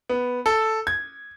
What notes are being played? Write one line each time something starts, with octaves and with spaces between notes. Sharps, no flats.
B3
A4
G#6